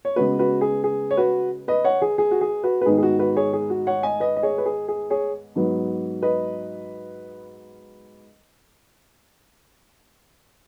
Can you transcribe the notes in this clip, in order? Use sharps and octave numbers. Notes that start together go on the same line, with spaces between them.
C#5
C#3 G#3 B3 F#4 B4
F#4 B4
G#4
G#4
C#5
F#4 B4
B4 D#5
C#5 F#5
G#4
G#4
F#4
G#4
F#4 B4
B4
G#2 D#3 B3 G#4
G#4
F#4
F#4 B4
G#4 C#5
G#4
F#4
C#5 F#5
D#5 G#5
B4 D#5
D#5
G#4 C#5
B4
G#4
G#4
G#4 C#5
G#2 F#3 B3
B4 D#5